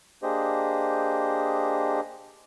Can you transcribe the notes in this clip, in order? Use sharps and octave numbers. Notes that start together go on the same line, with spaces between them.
A#3 D4 G4 G#4 C5 D#5